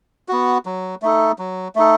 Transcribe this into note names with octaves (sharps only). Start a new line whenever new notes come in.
B3 F#4
F#3
A3 D#4 A4
F#3
A3 D#4 A4